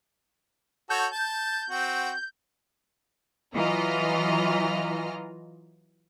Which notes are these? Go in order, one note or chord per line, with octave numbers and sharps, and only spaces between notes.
F#4 A4 C#5 G6
A5
C4 F#4
E3 F#3 F4 D#5 A#5 F6